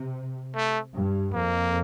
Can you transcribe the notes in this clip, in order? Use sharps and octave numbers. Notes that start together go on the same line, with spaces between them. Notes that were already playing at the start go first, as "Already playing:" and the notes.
Already playing: C3
A3
G2
F2 A#3